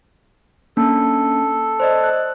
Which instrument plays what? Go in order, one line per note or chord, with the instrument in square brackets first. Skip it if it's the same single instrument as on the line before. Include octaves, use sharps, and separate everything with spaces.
[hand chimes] A#3 C#4 D4 [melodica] A4
[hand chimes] C5 D5 D#5
F#6